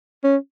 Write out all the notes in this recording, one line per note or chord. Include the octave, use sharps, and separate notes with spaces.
C#4